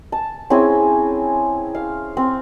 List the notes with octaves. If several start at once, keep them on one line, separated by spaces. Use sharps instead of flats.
A5
C4 C#4 E4 G#4
F5
C4